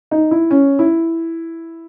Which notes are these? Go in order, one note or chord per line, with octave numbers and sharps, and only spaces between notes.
D#4
E4
C#4
E4